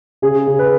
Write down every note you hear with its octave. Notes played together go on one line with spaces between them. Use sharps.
C#3 G#4
C#3
B4